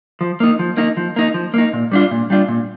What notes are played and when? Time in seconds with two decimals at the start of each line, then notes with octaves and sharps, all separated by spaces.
0.21 F3
0.40 A#3 D#4
0.59 F3
0.77 A#3 D#4
0.97 F3
1.16 A#3 D#4
1.34 F3
1.54 A#3 D#4
1.73 A#2
1.92 G3 D4 F4
2.11 A#2
2.30 G3 D4 F4
2.49 A#2